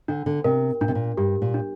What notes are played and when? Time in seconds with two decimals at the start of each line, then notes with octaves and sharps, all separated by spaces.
0.08 D3 D4
0.26 D3
0.44 C3 A#4
0.81 A#2 D4
0.88 C3
0.95 A#2
1.17 G2 G4
1.42 A#2
1.54 D4